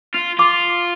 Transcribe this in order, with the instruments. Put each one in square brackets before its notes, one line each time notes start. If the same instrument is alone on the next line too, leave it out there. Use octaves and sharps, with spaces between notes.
[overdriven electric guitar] F4
[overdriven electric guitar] F4 [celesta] D6